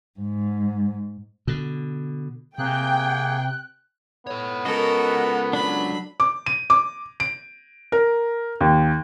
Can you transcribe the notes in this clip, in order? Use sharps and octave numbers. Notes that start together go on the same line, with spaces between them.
G#2
B2 D3
C3 A#3 G#4 G5 F#6
B3 A4 C#5
G#3 C#4 F#4 A4 A#4 D#5
F#3 D4 B5
D6
D#7
D6
D7
A#4
D#2